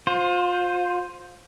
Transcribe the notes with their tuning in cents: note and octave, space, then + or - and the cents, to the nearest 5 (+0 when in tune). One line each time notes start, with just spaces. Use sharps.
F4 +30 C5 +0